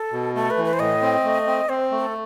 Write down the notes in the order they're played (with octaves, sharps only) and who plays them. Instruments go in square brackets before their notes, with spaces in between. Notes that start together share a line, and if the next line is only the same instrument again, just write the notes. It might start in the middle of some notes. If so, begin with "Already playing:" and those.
Already playing: [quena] A4
[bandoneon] B2
[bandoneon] A3 [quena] A4
[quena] B4
[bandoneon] E3
[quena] B4
C5
[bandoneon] A2 [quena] D#5
[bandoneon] C4
A3
C4
[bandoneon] C4 [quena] C5
[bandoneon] A3
[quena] A4